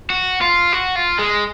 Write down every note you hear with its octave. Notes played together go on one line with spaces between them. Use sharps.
F#4
F4
F#4
F4
G#3